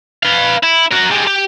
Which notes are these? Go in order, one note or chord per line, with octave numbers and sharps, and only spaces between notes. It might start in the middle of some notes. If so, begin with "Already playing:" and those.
B4 F5
E4
F#4 A#4
G3 G#3
G4